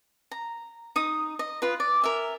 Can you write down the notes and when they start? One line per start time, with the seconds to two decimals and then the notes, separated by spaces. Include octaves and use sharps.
0.31 A#5
0.96 D#4 D#6
1.39 D#5
1.62 F4 B4
1.80 D5
2.02 A#4 E5 G#5